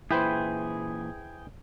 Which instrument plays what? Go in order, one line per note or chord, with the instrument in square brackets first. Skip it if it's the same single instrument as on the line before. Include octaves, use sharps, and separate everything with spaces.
[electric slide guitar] A#2 E3 [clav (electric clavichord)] E4 B4 C5 [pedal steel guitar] G#4 G5